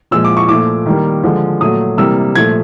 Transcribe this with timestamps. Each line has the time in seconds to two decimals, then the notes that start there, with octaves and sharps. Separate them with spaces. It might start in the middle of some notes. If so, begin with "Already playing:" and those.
0.11 A#2 F3 G#3 E6
0.25 D6
0.37 C#6
0.49 A#2 F3 A3 D6
0.86 D#3 G3 A#3
1.23 D3 F3 G#3
1.60 A#2 F#3 A3 D#6
1.97 C3 E3 G3 A#3 E6
2.35 A#2 F3 A3 G#6